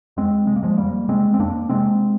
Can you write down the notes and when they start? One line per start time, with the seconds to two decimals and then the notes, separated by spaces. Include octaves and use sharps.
0.17 F2 G#3 C4
0.47 C3 G#3
0.56 A#3
0.63 F3 G#3
0.77 F2 G3 A#3
1.08 C3 G#3 C4
1.34 C4
1.39 F2 A#3 D4
1.69 C3 G#3 C4